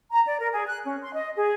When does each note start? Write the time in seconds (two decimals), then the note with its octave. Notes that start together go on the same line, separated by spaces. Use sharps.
0.11 A#5
0.26 D5
0.39 A#4
0.52 G#4
0.66 F#6
0.84 C#4
1.01 C6
1.13 D#5
1.36 G#4